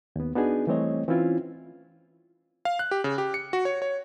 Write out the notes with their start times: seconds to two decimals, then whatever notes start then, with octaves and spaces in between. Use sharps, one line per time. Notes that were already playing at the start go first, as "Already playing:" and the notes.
0.16 D#2 B3
0.36 B3 D4 D#4 F#4 G#4
0.67 E3 G3 A3 C4 C#5 D#5
1.08 E3 C4 C#4 E4 F4
2.65 F5
2.79 F#6
2.91 G4
3.04 C#3
3.18 G4
3.34 C#7
3.53 F#4
3.65 C#5
3.82 C#5